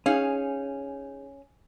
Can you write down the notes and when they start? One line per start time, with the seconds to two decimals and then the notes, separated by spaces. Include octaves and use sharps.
0.06 C#4 D#4 G#4 F5